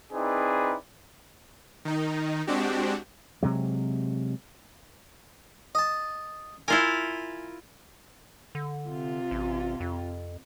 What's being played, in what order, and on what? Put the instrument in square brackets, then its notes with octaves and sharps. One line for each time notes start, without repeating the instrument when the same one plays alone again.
[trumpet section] C4 D#4 E4 G#4 B4 D5
[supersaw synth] D#3 D#4
G#3 C4 D4 F#4 G4
[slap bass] C3 F#3 G#3
[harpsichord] D#5 A5
[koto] E4 F4 A#4 [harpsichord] G#5
[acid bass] D3
[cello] C3 F4
[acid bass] A1
F2